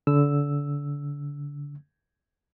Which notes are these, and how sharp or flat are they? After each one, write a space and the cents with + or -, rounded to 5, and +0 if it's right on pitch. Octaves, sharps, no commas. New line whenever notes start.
D3 -30 E6 +0